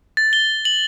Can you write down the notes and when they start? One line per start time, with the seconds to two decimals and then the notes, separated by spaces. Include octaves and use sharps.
0.17 A6
0.33 G7
0.65 F#7